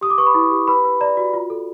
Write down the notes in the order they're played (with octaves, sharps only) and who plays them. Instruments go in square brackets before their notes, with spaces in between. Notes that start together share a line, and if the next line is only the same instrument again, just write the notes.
[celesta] G4 D#6
D6
B4 C#6
B5
E4
G4
B4 B5
B4
D5 A#5
F#4
F4
A4